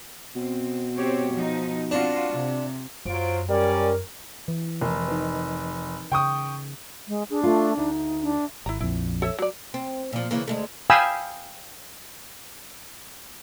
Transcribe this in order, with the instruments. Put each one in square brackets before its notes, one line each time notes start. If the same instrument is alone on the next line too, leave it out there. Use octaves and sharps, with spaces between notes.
[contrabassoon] B2 [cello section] C4
[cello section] C4 G4 C#5
F3 D#4
[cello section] C4 F4 F#4 [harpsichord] D4
[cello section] C3
[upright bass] F#2 [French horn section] F#3 F4 C5 [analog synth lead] D7
[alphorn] G3 [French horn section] C#4 D5 [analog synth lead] A#4
[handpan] E3
[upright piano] F1 [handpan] A#4
[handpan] D#4 B4
[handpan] C#3 [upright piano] G5 C#6 D#6
[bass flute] G#3
[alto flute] D4 [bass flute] G#4
[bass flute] A3 [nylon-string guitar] F4
[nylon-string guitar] D2 [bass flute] D#4
[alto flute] D4
[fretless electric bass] G#1 [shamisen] E4 A#5
[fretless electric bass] A#1 F2 [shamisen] E4
[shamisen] A4 C#5 E5
F#3 D5
[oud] C4
A#2 F3
C#3 E3 A#3
D2 G#3 A3
[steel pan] F5 G5 G#5 B5 D#6 E6